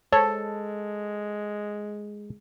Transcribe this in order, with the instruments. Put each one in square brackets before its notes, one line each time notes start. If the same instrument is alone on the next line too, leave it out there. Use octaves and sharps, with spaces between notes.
[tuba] G#3 [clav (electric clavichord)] A4 [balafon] C5 A5 [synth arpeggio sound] C#5